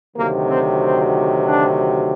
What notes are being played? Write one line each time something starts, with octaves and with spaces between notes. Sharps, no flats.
D2 C3 D#3 F#3 A#3
C4
C4
D4